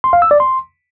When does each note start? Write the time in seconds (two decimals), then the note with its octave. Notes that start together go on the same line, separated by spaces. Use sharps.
0.04 C6
0.13 F5
0.22 E6
0.31 D5
0.40 C6